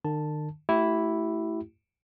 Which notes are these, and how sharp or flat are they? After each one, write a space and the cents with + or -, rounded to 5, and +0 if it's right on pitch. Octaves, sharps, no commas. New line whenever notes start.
D#3 -45 A5 +0
A3 +0 E4 +0 G4 -40